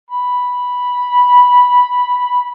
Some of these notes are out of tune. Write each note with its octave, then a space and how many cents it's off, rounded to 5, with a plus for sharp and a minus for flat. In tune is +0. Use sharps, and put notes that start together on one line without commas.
B5 -5